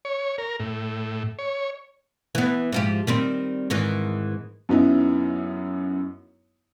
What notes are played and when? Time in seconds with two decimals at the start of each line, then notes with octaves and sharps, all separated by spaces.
0.05 C#5
0.38 A#4
0.60 A2
1.39 C#5
2.35 E3 B3
2.72 G#2 F3 G4
3.07 D#3 G3 C4
3.70 G#2 D#3 E3
4.69 F#2 B3 D#4 E4